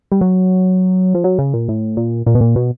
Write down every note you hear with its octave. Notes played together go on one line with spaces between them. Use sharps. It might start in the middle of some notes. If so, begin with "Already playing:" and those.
G3
F#3
F3
F#3
C#3
A#2
A2
A#2
A#2
B2
A#2
B2